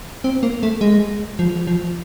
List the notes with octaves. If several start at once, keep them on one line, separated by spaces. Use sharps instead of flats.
C4
A#3
A3
G#3
F3
F3